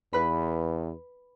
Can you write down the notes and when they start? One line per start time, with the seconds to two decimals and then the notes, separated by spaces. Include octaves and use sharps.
0.13 E2 B4 B5